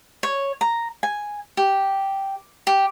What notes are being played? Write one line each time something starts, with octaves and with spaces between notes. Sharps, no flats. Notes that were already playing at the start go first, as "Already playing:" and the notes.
C#5
A#5
G#5
G4
G4